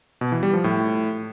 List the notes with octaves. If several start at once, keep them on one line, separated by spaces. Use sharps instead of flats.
B2
E3
G3
F3
A2